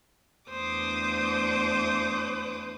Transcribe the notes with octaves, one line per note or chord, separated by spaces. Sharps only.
E2 A3 D4 C5 D6 D#6